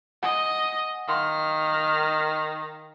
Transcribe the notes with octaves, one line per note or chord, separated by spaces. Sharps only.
D#5 F#5 G#5
D#3 F5 C6 F6